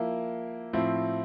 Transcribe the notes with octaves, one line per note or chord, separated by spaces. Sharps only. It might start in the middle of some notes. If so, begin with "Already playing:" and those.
Already playing: F3 A#3 E4
A2 F3 C4 E4